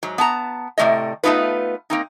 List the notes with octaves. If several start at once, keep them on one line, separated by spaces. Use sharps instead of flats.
G#2 F#3
B3 A5 A#5
A2 C3 A3 D5 D#5
A3 B3 D#4 F4 B4
A#3 C4 D#4